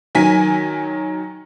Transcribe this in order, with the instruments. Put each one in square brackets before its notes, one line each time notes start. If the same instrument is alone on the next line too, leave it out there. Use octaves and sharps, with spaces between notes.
[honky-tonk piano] D#3 F#3 G#5 B6